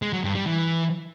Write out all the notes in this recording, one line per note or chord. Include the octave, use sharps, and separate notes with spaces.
G#3
F#3
G2
G3
E3